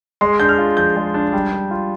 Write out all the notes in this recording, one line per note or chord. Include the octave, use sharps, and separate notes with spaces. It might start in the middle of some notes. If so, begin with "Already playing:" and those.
G#3 C6
D4 G6
F6
F4
F3 G6
G#3
D4
G3
D4
F4